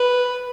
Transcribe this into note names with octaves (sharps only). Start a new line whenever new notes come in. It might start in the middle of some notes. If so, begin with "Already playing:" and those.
Already playing: B4